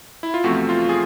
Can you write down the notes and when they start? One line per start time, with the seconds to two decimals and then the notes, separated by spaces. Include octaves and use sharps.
0.23 E4
0.34 F4
0.44 E2 C3 F3 A3 C4 F#4
0.69 F4
0.89 G#4